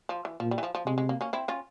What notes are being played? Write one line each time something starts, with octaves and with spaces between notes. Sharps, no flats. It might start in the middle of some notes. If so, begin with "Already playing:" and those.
F3
E3
A#2 F3
G3
E3
F3
F3
C3 G#3
G#3
A#3
A#3 C#4
C4 E4
C#4 F4